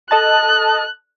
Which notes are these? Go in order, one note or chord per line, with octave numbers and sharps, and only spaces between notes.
A4 D#5 A5 F#6